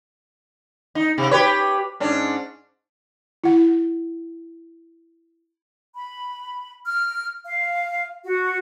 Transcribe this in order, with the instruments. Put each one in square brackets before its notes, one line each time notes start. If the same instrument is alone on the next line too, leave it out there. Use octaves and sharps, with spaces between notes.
[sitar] D#4
C3
G4 B4 C#5
G#2 C#4 D4
[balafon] E4 F#5
[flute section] B5
F6
F5
F#4